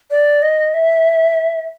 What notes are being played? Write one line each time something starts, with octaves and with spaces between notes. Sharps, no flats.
D5
D#5
E5